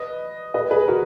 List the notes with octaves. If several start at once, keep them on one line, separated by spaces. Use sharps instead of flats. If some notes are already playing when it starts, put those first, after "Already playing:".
Already playing: B4 D#5
B4 D#5
G#4 B4
F#4 A#4